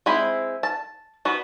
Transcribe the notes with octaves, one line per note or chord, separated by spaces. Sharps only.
G#3 C4 E4 B5
A5
B3 F#4